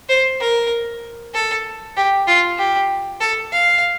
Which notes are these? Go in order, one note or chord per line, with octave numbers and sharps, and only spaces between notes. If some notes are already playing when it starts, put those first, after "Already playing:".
C5
A#4
A4
G4
F4
G4
A4
F5